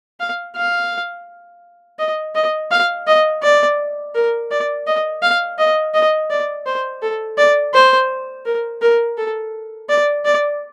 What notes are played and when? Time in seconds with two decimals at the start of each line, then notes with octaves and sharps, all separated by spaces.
0.20 F5
0.56 F5
1.99 D#5
2.35 D#5
2.71 F5
3.07 D#5
3.43 D5
4.15 A#4
4.51 D5
4.87 D#5
5.22 F5
5.58 D#5
5.94 D#5
6.30 D5
6.66 C5
7.02 A4
7.38 D5
7.74 C5
8.45 A#4
8.82 A#4
9.18 A4
9.89 D5
10.25 D5